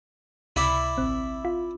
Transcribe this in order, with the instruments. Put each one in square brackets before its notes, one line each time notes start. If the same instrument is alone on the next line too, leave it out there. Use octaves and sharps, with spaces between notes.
[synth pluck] C#2 C3 B5 [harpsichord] E4 D5 E5
[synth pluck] A1 C4
F4